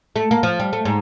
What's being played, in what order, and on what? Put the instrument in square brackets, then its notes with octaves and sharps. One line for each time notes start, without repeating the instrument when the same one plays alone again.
[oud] A3
A#3
F3
G3
A3
G#2